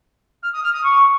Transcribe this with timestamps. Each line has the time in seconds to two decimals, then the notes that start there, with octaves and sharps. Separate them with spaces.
0.42 F6
0.52 D#6
0.63 F6
0.73 D#6
0.83 C#6